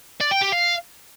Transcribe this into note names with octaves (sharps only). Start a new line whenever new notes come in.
D5
G5
G4
F5